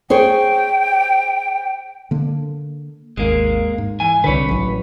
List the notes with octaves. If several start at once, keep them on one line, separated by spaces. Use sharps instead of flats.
G#4 C5 C#5 G5
D3 A#3
G#1 D#2 G#3 A#3
G#2
E3 G#5
C2 D3 B4 C#5
A1 F#3